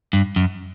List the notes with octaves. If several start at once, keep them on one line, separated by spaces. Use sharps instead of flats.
G2
F#2